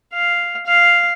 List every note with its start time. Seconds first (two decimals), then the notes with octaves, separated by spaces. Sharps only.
0.13 F5
0.66 F5